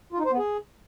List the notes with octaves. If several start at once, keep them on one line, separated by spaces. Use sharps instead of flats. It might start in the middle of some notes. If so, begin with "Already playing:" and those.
F4
D#4
C5
B3
G#4